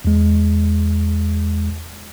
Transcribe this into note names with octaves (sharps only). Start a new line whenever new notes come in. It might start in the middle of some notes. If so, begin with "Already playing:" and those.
E2 G#3